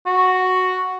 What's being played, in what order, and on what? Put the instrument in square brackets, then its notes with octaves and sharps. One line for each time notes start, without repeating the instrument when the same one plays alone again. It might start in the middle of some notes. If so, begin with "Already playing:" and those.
[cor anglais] F#4